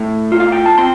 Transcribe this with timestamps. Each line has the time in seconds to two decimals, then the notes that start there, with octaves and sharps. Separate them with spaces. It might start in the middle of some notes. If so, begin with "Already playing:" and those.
Already playing: A2
0.32 F4
0.40 F5
0.52 G5
0.66 A5
0.78 C4 G5 C6